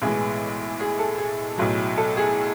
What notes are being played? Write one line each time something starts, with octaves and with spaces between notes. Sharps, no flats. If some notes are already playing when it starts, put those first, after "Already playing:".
B1 A2 E3 G#3 G#4
G#4
A4
G#4
B1 A2 F#3
A4
G#4